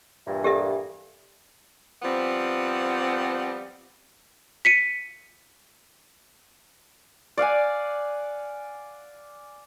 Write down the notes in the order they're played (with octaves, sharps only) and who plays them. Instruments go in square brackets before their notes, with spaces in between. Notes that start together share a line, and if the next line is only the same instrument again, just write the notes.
[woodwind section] G2 A#2 E3
[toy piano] G4 A4 E5
[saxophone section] F3 G3 B3 C4
[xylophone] B6 C#7 D#7
[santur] D5 F5 F#5 G#5